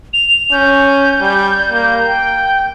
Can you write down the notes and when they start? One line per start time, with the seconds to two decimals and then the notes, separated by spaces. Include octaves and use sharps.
0.13 F7
0.52 C#4 G6
1.21 G3
1.72 A#3
2.08 G5